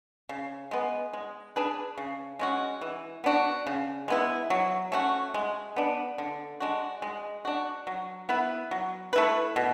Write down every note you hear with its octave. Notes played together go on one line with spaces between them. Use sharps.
C#3
G#3 B3
G#3
D4 G#4 B4
C#3
G#3 C#4 F#4
E3
B3 D4 F#4
C#3
G#3 B3 E4
F#3
A3 C#4 F#4
G#3
B3 D4
D3
G#3 D4 F#4
G#3
D4 F#4
F#3
B3 E4 B4
F#3
A3 E4 B4
B2